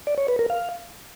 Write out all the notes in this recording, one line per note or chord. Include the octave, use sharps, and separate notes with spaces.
D5
C#5
B4
A#4
F5